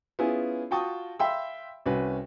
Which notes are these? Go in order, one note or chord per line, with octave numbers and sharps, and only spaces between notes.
B3 C#4 E4 F4 G#4
F4 F#4 G5 A5 C#6 D#6
E5 F5 G5 B5 C6 E6
C2 C#4 F#4 B4